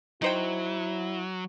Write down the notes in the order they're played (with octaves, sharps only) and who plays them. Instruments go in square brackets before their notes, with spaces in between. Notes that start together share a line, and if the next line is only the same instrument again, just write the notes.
[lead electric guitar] F#3 [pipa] D#4 C5 G5 [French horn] E4